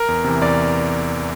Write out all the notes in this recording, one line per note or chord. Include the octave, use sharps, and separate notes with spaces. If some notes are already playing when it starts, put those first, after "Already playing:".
Already playing: A#4
E2
C3 E3
E2 D5